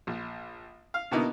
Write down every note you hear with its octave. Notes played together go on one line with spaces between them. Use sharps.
A#1
F5
B2 D3 A#3 B3 D#4 E4